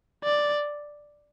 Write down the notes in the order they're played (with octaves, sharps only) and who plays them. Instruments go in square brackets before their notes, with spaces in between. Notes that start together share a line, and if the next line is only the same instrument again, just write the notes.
[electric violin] D5